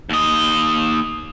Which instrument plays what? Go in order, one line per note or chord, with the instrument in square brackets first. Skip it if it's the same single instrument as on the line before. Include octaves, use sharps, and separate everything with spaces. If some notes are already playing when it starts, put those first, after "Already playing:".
[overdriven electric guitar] D#2 D#5